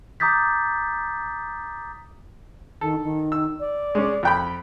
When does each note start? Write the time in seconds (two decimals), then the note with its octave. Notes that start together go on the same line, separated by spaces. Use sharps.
0.20 A#5 D6 D#6 G6 A6 B6
2.81 D#3 A4
3.04 D#3
3.32 E6
3.60 D5
3.95 G#3 C#4
4.23 F2 G5 B5